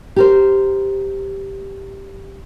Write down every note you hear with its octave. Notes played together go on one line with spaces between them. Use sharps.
G4 A#4 C5